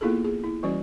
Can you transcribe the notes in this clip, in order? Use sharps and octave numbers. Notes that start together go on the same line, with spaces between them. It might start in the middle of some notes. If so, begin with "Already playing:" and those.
A#3 B3 E4 F4 G#4 A4
G#4
E4
E3 G3 C#4 F#4 D5